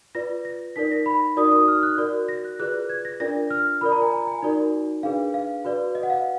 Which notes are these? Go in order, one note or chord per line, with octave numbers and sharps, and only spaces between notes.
F4 B4 D5 A#6
A#6
D#4 A#4 D5 B6
A#6
B5
D#4 F#4 A#4 D5 D#6
D#6
F6
F#6
F#4 A#4 D5
A#6
F#6
F4 G#4 B4 D5 F#6
G#6
A#6
D4 F4 A#4 D5 A#6
F6
F4 A#4 D5 B5
A#5
G#5
A#5
G#5
D#4 F#4 A#4 D5
D4 G#4 B4 F5
F5
F#4 B4 D5
D#5
F#5
F5